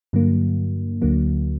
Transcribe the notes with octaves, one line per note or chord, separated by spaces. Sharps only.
G2 D3 F#3 A#3
D2 D3 F#3 A#3